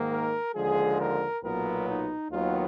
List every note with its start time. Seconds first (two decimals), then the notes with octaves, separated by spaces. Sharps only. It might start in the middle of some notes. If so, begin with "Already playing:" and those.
Already playing: G#2 D#3 A#3
0.11 A#4
0.55 D#2 D3 F3 G#3 G#4
0.99 A#4
1.43 B1 A#2 F#3 B3 A#4
1.88 D#4
2.31 D#2 D#3 F#3 B3 F4